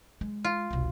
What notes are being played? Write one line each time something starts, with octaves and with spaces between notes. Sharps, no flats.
G#3
F4
E1 C2